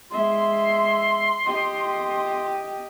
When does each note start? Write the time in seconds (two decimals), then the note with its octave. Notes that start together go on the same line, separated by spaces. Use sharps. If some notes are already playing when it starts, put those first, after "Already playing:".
0.11 G#3 E5 C6
1.44 G4 D#5